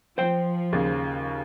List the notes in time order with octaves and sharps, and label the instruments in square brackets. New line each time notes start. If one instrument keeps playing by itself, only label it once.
[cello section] F3 [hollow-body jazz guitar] C5 G5
[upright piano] D#2 C#3